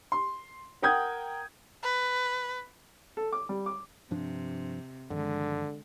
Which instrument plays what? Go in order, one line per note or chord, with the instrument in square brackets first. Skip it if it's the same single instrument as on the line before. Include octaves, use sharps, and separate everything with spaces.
[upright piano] C6
A#4 F#5 G5 D#6 G6 G#6
[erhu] B4
[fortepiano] A4
D6
G3
D6
[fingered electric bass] G2 F3 D4 [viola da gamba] C3
[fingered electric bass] G2 D#3 F3 [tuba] D3 [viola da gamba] G#3